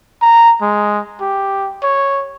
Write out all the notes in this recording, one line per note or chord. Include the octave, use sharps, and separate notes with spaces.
A#5
G#3
G4
C#5